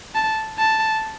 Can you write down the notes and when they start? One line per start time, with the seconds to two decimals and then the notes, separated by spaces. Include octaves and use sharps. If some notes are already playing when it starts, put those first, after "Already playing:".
0.15 A5
0.59 A5